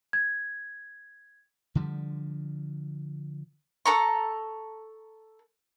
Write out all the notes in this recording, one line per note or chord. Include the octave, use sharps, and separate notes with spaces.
G#6
D3 F3 G3
A4 A#5 C#6